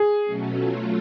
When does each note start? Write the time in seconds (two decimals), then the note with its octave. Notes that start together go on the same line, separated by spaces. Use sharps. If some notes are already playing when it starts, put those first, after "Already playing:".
Already playing: G#4
0.24 B2 F#3 A3 C#4
0.56 F#3 A3 F4